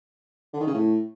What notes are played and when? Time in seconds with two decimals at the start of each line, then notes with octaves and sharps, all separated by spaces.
0.53 D3
0.60 D#3
0.67 C#3
0.74 A2